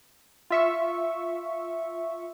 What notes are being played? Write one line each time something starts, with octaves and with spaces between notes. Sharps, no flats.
F4 E5 C#6